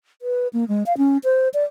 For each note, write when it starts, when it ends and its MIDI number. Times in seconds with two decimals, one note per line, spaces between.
0.22 0.48 71
0.53 0.67 58
0.68 0.83 56
0.86 0.96 77
0.98 1.18 61
1.24 1.49 72
1.54 1.64 74